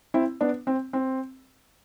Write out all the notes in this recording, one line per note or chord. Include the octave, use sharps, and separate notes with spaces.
C4 E4
B3 D4
C4
C4